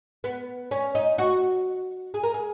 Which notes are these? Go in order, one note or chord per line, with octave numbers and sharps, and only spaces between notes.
B3
C#4
D#4
F#4
G#4
A#4
G#4